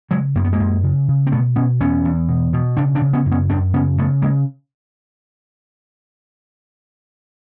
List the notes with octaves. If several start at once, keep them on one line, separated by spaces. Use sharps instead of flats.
C#3 F#3 G#3
F#2 A#3
B3
G#3 A#3
F#2
C#3
C#3
C4
B2 A3 B3
B2 B3 C#4
E2 B3 C#4
E2
B2
B2
C#3 C4 D4
C4 D4
C#3
B3 C#4
F#2
B3 C#4
F#2 C4 D4
C#3 B3 C#4
C#3 A3 B3
C#3 G#3 A#3